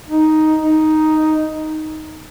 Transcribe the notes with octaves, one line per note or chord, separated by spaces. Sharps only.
D#4
D#4